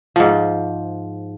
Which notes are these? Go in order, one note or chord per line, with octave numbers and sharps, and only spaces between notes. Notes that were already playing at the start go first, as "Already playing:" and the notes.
G#2 F3